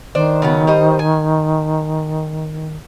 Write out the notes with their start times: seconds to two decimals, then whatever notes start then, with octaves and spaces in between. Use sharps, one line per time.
0.15 D#3 D4 C5
0.42 C#3 F#3 B3
0.67 G3 C5 D#5
0.99 G#5